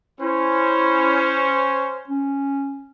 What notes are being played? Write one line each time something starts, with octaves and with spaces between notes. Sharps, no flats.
C#4 E4 C5
C#4